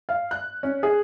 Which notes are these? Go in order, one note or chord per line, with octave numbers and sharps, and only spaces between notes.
F5
F#6
C#4
G#4